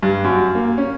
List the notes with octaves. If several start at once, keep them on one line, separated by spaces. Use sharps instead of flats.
G2
F#2
A#3
C#4